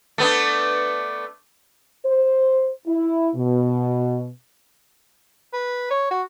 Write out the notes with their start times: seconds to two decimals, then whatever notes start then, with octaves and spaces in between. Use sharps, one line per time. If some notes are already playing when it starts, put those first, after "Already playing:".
0.18 A3 B3 D4
2.06 C5
2.87 E4
3.36 B2
5.53 B4
5.91 C#5
6.11 F#4